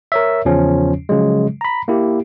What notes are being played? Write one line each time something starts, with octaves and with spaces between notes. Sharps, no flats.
A#4 C#5 E5
E2 C#3 F3 C#4
C#3 F3 F#3 G#3
A#5 B5
A#3 E4 G4